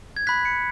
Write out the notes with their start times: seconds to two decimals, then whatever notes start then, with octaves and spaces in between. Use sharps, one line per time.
0.16 G#6
0.27 B5 F#6 B6
0.45 C#7